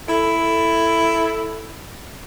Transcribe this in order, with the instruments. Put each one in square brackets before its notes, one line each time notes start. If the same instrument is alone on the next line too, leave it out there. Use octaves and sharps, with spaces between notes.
[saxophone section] E4 A4